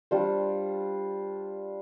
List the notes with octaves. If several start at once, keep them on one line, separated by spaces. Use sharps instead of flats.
G3 D4 F4 C5